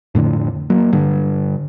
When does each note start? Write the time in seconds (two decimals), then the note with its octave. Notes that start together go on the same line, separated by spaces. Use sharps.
0.15 F2 A2 D3
0.70 F#3 A#3
0.93 G2 D3